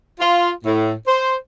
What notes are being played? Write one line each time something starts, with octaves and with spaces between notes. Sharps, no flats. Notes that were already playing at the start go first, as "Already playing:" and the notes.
F4
A2
C5